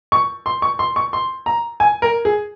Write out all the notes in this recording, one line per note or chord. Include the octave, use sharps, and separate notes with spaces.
C#6
C6
C#6
C6
C#6
C6
A#5
G#5
A#4
G#4